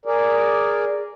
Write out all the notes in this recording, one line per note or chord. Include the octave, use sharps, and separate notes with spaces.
G#4 A#4 D5